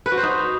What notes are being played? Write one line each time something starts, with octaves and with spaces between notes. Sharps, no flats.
B4
F#4
C5
D#4